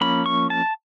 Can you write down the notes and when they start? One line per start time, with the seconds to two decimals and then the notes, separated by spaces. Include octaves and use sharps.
0.01 F3 A#3 C#4 B5
0.26 C#6
0.50 A5